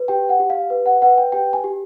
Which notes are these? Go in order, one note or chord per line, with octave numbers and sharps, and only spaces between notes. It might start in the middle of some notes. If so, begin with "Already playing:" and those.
Already playing: B4
G4 G5
F#5
G4
F5
B4
F#5
B4 F#5
G5
G4 G5
G#5
G4